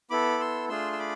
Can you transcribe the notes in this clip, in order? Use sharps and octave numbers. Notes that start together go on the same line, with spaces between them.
B3 E4 A4 B5 D6
C6 E6
A3 D4 F4 G#4 C6 E6
E6
B5 D6